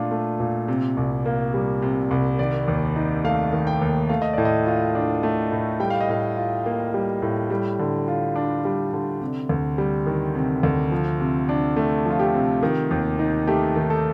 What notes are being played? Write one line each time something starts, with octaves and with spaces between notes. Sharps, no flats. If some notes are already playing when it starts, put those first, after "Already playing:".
Already playing: A#2 A3 D4 F4
A3
A#2
C3
C2
A#3
G3
C3
C2
D#3 D5
D#2
D#4
A3 F5
D#3
G5
D#2
A3 F5
D#5
A2 D5
D#5
F4
D4
A3
A2
G3 G5
F5
D#5
A2 F5
F4
A#3
G3
A2
G3
D3
F4
D4
G3
D3
C3
D2
G3
D#3
C3
D2
F3
C3
D4
A3
F3 F4
G4
C3
D#3
D#2
D#4
A3 G4
D#3
A4